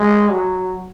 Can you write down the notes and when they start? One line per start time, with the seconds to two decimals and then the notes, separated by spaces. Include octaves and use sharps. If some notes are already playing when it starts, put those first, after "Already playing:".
Already playing: G#3
0.31 F#3